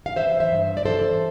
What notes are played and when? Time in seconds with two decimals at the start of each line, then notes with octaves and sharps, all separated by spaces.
0.06 F5
0.16 E3 C5 E5
0.40 C5 E5
0.52 G2
0.77 D5
0.85 E3 A4 C5